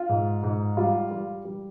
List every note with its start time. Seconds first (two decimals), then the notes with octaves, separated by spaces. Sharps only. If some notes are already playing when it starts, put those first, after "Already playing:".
Already playing: F4
0.09 G#2
0.43 G#2
0.77 G3 F4
1.11 G3
1.45 G3